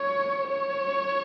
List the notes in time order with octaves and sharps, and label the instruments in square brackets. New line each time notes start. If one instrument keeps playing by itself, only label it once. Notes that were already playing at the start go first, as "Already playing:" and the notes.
Already playing: [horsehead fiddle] C#5
C#5